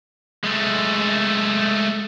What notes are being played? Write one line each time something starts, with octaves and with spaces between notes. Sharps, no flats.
G#3 A3